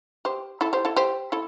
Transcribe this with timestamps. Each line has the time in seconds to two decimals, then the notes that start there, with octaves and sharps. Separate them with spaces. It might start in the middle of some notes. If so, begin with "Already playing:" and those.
0.25 G4 C5
0.61 E4 A4
0.73 G4 C5
0.85 E4 A4
0.96 G4 C5
1.32 E4 A4